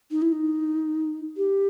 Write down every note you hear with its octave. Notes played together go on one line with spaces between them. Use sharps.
D#4
E4
D#4
G4